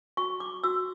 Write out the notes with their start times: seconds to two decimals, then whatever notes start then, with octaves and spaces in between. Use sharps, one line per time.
0.17 F#4 C#6
0.40 D6
0.64 F#4 E6